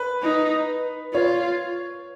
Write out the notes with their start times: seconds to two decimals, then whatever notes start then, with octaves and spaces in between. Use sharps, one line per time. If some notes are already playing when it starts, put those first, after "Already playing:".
Already playing: B4
0.23 D#4
1.13 F4 C#5